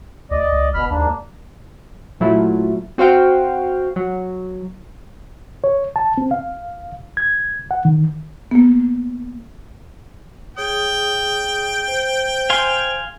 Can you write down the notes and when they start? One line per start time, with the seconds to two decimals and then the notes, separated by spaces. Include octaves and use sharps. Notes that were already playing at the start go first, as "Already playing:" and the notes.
0.31 D2 D5 D#5
0.52 C#2
0.74 G1 B2 B5 F6
0.90 D#2 G#2 A#3 D4
2.20 A#2 F#3 A3 E4 F4
2.98 C4 F#4 C5 F5 G5
3.96 F#3
5.64 C#5
5.96 A5
6.18 C4
6.31 F5
7.17 G#6
7.71 F#5
7.85 D#3
8.51 A#3 B3
10.57 G#4 C#5 G5 D#6
11.88 C5
12.50 F5 G#5 C6